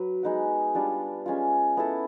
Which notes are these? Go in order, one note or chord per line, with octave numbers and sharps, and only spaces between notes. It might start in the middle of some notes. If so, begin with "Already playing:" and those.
Already playing: F#3 B4
G#3 B3 D#4 F#4
G3 B3 D4 F4
G#3 C#4 F4
B3 E4 A4